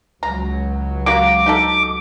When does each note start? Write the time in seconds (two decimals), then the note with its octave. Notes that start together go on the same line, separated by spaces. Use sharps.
0.23 C#2 F#3 A#5
1.06 A#3 F#4 G4 D6
1.46 D#4 G4 A4